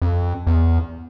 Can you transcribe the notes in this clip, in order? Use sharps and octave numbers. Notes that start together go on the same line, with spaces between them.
F2
E2